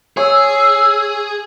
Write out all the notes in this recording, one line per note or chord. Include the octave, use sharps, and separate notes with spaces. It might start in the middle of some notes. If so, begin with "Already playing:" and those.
G#4 C#5 E6